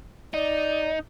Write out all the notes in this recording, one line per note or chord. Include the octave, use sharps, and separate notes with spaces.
D#4 D5